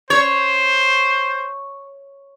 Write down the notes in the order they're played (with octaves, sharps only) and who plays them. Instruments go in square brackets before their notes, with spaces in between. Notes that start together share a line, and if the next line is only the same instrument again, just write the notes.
[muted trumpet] C5 [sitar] C#5